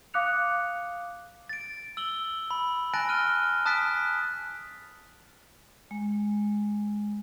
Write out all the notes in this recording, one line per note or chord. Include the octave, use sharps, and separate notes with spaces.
F5 D6 D#6 F#6 C#7 F7
A6 D7
E6 F#7 G7
B5
G#5 A5 F#6 A6 A#6 D7
F6 D#7 G7
A5 D#6 F#6 A6 B6 D7
G#3